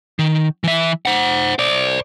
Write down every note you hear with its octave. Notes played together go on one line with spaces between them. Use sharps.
D#3
E3 E5
C5 F#5
C5 D5